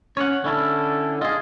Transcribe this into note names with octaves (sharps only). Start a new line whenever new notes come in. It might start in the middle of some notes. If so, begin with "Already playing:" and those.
C#4 C#5 F#5
D3 C#4 E4 A4
F4 G#4 D#5